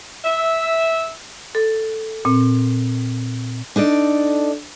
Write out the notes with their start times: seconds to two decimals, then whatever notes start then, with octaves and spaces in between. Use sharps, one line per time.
0.24 E5
1.55 A4
2.25 A#2 C4
3.76 D4 D#4 A4 D5